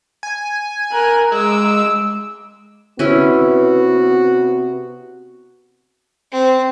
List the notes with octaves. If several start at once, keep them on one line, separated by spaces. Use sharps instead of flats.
G#5
A#4 F#6
G#3 D6 E6
C3 B3 C#4 E4 F#4
C4